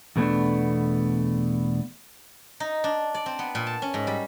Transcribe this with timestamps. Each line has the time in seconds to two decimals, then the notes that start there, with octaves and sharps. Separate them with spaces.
0.16 E2 B2 A3 B3 D4
2.60 D#4
2.84 D4
3.14 D5
3.26 C4
3.39 B3
3.55 A#2
3.67 A5
3.82 C#4
3.94 G#2
4.07 G3